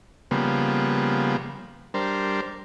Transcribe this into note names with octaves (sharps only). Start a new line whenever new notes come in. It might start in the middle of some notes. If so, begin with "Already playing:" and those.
C#3 F3 G3 A#3 B3
G3 D4 A#4 C5